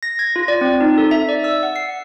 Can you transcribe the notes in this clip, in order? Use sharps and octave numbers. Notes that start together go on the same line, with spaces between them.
A#6
G#6
F4
D5
C4
D#4
A4
E5
D5
E6
F#5
C7